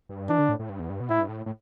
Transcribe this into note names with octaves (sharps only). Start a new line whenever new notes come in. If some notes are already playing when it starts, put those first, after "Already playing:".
G2
E3 D4
D3
A2
A2
G2
E2
G2
B2
A2 E4
G2
A2
A2